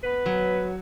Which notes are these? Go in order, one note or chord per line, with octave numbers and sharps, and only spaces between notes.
B3 B4
F#3